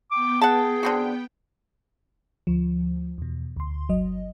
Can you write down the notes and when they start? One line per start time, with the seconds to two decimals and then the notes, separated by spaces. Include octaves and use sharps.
0.11 B3 G5 D6
0.42 G#4 F#5 A5
0.83 D3 C4 F#4
2.47 D2 F3
3.18 E2 B2
3.56 D2 C6
3.89 G1 F#3 D#5